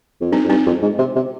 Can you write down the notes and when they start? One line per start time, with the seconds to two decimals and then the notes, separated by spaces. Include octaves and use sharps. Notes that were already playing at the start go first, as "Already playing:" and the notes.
0.21 F2
0.32 G2 C4 D#4
0.44 F2
0.49 G2 C4 D#4
0.66 F2
0.82 G#2
0.99 C3
1.16 C3